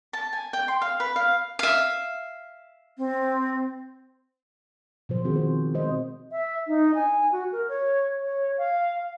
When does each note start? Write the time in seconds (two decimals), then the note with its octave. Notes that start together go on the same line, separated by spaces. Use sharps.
0.13 A5
0.33 G#5
0.53 G5
0.68 C6
0.81 F5
1.00 B4
1.16 F5
1.59 E5 F5
2.98 C4
5.09 B2 F3 C5
5.24 D#3 C4 F#4 G#4
5.36 C5
5.74 G#3 C4 C5 D#5
6.32 E5
6.68 D#4
6.95 G#5
7.32 F#4
7.52 A#4
7.69 C#5
8.22 C#5
8.58 F5